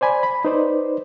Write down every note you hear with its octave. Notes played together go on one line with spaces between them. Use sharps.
C5 D5 G#5 B5
B5
D#4 B4 C5 D5